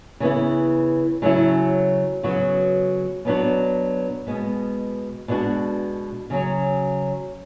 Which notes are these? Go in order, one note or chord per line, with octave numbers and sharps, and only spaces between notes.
C#3 E3 B3 E4
C#3 F#3 A3 C#4 E4
C#3 F#3 B3 F#4
B2 F#3 B3 D4 F#4
B2 G#3 B3
B2 G#3 D4 F#4
C#3 F#3 C#4